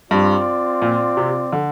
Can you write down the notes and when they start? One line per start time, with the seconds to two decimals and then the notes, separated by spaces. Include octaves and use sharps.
0.11 G2 C4 F4 D5
0.82 A#2
1.17 C3
1.53 D3